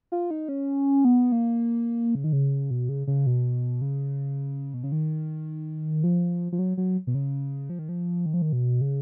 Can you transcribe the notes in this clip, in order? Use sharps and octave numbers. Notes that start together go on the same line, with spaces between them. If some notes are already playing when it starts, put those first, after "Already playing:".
F4
D#4
C#4
B3
A#3
C#3
D#3
C#3
B2
C#3
C#3
B2
C#3
B2
C#3
D#3
F3
F3
F#3
F#3
B2
C#3
F3
D#3
F3
D#3
F3
D#3
B2
C#3